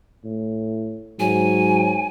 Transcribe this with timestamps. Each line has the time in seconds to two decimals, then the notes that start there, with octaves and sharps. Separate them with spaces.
0.25 A2
1.20 G#2 F#3 G#5